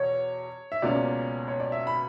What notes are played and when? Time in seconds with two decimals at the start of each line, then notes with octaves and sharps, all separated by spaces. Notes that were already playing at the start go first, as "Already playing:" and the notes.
Already playing: E2 B2 C#5
0.72 E5
0.82 C#2 B2 A#3 C#4 D5
1.48 C#5
1.60 D5
1.72 E5
1.87 B5